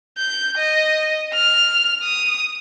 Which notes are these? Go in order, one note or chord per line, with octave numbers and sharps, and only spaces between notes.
G6
D#5
F6
D#6